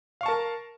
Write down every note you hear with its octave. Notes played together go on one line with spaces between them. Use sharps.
A#4 F5 A5 C#6